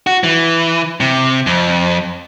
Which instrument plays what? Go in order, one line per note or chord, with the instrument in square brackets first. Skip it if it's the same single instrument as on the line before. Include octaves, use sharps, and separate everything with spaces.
[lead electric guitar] F#4
E3
C3
F2